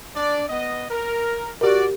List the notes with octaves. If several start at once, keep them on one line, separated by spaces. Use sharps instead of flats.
D4 D5
B3 D#5
A#4
F#4 G4 A#4 D5